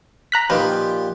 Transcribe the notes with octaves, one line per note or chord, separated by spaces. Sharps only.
A#5 F#6 B6
A#2 D#3 F3 G4 B4